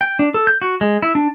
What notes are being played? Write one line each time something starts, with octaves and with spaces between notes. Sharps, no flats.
G5
D4
A4
G6
F#4
G#3
E4
D4